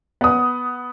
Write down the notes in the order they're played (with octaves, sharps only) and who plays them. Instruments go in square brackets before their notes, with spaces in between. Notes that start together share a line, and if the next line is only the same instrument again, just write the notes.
[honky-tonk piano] B3 D#6